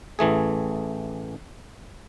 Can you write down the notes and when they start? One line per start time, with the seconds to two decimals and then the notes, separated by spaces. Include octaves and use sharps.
0.19 A1 E3 A3 G#4